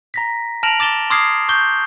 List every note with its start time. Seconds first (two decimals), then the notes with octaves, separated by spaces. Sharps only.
0.14 A#5 A#6 B6
0.63 A5 F6 A#6 D7 F7 F#7
0.80 D6 A6 E7 G7
1.10 C6 D6 D#6 F6 G#6 C7
1.49 C#6 G6 G7